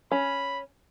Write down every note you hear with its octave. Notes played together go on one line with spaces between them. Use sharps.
C#4 B5